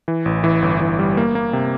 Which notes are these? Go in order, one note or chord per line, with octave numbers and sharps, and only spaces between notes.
E3
A1
E3
G1
E3
G3
A#3
A#3
C3